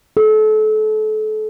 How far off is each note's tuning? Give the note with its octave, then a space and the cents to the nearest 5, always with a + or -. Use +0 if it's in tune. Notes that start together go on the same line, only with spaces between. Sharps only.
A4 -30